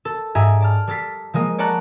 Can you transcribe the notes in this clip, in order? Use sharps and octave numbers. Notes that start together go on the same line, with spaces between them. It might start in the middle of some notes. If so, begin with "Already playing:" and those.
A4
G#2 G4 G#4 E5 G#5 A#5
D5 A5 F6
G3 A4 A6 B6 C7
F3 G#3 A#3 D#5
C#5 D5 F#5 A5 A#5 F#6